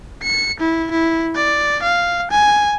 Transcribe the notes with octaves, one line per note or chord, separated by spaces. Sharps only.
C#7
E4
E4
D5
F5
G#5